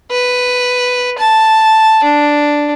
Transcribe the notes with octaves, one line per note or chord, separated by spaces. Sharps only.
B4
A5
D4